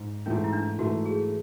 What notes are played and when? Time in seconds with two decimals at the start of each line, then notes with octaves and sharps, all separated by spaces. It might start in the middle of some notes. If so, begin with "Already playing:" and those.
Already playing: G#2
0.26 G#2 E3 A3 C#4
0.44 E4
0.53 D4
0.78 G#2 E3 A3 F#4
1.05 G#4